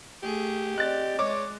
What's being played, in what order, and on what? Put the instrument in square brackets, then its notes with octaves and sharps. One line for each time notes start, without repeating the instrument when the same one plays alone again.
[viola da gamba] A3 G#4 [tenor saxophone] G4
[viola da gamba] C4 D5 [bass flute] D#5 [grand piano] F#6 A6
[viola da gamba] G#3 [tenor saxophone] C#5 [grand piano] D6